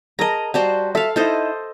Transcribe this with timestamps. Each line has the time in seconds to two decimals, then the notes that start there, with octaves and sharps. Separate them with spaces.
0.19 G#4 A#4 D#5 A5 A#5
0.54 G3 F#4 C5 D5 A5
0.95 A4 E5 F5
1.16 D#4 E4 A4 C5 D#5